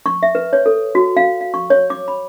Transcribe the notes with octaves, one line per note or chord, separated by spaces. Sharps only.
C#6
E5
B4
C#5
A4
F#4
F5
F5
C#6
C#5
D6
B5